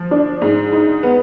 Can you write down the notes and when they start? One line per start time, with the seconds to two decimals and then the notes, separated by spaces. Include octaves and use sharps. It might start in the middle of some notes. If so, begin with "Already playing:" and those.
Already playing: F3
0.11 D4
0.42 G#2
0.72 D#4
1.03 B3